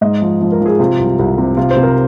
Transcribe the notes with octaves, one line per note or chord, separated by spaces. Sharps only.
G#2 D#5
F3
F3
A#4
F3
G#4
C3 F4
C2
C2
C3
C3 F4
C5
C3
A#4